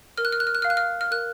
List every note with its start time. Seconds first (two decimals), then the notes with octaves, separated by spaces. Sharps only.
0.18 A#4 F6
0.25 F#6
0.32 F6
0.40 F#6
0.47 F6
0.55 F#6
0.62 F5 F6
0.70 F#6
0.77 F6
1.01 F6
1.11 A#4 F#6